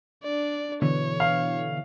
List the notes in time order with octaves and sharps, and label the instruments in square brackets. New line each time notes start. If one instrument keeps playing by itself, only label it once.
[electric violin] D4 D5
[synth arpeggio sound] B2 D3 E3 [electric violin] C#5
[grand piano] F5